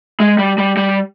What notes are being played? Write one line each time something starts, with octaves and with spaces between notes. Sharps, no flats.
G#3
G3
G3
G3